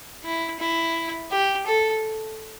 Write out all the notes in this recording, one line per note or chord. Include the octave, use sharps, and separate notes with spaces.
E4
E4
G4
A4